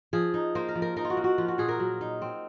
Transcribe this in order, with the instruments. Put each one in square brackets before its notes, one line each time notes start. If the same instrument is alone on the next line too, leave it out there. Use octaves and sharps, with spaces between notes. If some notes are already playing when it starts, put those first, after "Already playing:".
[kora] F3 G#4
D#4
A#3 C5
A#4
F3
A#4
D#4 A#4
F4
F#4
A#3
F#4
F3 F4
F#4
A#2 G#4
A#4
F#3
D#4
C4